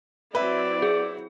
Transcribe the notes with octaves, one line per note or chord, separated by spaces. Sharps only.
F#3 C4 E4 B4 D5 E5
G#4